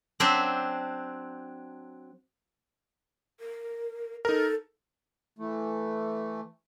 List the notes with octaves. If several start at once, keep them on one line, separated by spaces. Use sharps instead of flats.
F#3 C4 D4 C5 E5
A#4
D#4 A4 A#4
E3 A3